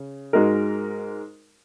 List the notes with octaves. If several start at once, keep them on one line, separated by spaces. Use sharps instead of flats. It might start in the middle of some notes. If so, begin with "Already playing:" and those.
Already playing: C#3
G#2 G#3 F#4 A#4